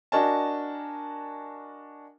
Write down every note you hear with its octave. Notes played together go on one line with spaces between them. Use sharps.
D4 F#4 A#4 D#5 G#5 A5